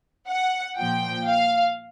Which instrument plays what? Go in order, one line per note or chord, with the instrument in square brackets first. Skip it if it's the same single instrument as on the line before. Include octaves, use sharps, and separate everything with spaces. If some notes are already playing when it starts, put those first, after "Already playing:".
[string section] F#5
A#2 F3 G5
F5